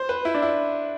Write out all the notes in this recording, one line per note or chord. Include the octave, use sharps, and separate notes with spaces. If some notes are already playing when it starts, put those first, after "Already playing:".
Already playing: C5
B4
E4
D4
E4